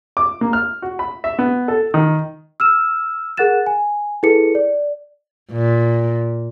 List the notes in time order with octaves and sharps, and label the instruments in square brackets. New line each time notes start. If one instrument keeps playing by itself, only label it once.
[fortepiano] D6
A#3
F6
F#4
B5
E5
B3
A4
D#3
[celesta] E6 F6 E7
G#4 A#4 F#5 F#6 A6 E7
G#5
E4 G#4 A4 B4 C#7
D5
[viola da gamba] A#2